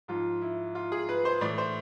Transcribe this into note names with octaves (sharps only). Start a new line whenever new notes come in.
G#2 F3 F4
E4
F4
G#4
B4
C5
A2 E3 D5
C5